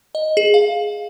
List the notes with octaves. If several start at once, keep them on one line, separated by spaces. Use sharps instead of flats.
D#5
G#4
F5